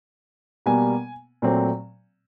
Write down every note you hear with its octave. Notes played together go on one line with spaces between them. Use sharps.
B2 G3 A#3 G#5
A#2 F#3 A3 C4